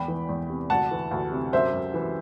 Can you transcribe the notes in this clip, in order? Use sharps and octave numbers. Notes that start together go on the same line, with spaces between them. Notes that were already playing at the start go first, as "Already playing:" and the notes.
Already playing: E2 G5 B5
E3
E2
C3
D2 F#5 A5
E3
D2
C3
F#2 C5 E5
F#2
E3